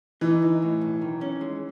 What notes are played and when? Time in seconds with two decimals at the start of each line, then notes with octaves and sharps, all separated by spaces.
0.21 E3 D#4
0.42 D#4
0.62 A2
0.81 B1
1.02 D#3
1.21 C#4
1.41 G#3